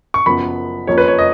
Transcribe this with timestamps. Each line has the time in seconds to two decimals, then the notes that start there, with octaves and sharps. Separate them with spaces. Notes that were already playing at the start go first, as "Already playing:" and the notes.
0.14 C#6
0.26 F#1 F#2 F3 B3 B5
0.87 F2 F3 A#3 C#4 C#5
0.98 B4
1.08 C#5
1.19 D#5